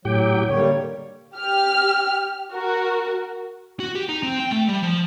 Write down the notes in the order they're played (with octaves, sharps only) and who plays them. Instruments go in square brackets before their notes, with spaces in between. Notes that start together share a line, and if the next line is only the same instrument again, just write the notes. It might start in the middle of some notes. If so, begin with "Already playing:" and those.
[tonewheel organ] A2 G4 G5 [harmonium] F#3
[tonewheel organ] D3 [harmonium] G3 A#3 C#5
[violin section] G4 F6
F#4 A#4
[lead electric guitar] F#4
G4
D#4
C4
G5
A3
G3
F3